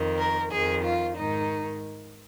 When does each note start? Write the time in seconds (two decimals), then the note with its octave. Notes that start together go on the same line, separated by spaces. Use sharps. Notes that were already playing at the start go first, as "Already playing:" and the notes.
Already playing: F2 D#3
0.18 A#4
0.51 F2 D#3 G#4
0.83 F4
1.17 G#2 D#3 D#4